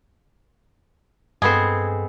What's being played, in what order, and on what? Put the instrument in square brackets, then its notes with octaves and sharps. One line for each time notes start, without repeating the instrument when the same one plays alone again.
[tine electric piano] G2 A4 [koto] G#3 B3 C4 [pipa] G#4